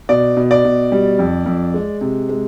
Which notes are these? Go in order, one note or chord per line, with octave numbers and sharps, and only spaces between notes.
B2 D5
B2
D5
B2
G3
F2
F2
G#3
C3
G#3